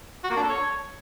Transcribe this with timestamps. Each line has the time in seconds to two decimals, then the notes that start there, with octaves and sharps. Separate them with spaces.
0.24 F#4
0.30 A#3
0.36 D4
0.43 A4
0.49 C#5